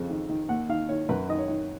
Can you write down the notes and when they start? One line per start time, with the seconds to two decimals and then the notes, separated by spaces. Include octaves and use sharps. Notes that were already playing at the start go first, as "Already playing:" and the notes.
Already playing: F2 C#3
0.10 D#3
0.29 D#3
0.49 D#2 F#5
0.69 D#3 F5
0.89 D#3 C#5
1.09 F#2 B4
1.29 D#3 D#5
1.38 C#5
1.48 D#3